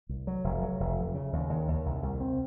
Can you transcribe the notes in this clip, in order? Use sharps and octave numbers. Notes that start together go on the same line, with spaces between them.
C2
F#3
F1
F#3
F1
F2
C#3
D#2
D#2
D#2
C2
C2
C4